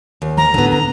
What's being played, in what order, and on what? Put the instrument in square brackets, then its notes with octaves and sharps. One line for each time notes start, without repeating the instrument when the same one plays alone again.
[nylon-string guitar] D#2
[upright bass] F3 [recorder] A#5
[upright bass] A1 E4 [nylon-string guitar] D3 B3
[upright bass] C#4 [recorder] A#5